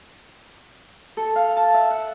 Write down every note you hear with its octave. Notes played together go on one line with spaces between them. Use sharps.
A4
F5
A5
E5
F#5